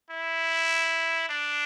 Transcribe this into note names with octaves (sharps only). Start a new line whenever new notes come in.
E4
D4